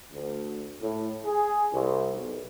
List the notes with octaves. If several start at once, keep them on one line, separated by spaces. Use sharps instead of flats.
D2
A2
G#4
C2
B1